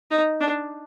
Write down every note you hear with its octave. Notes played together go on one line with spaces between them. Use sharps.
D#4
D4